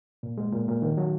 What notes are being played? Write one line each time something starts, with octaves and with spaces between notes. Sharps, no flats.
A#2
G#3
A#2
A#2
D#3
F#3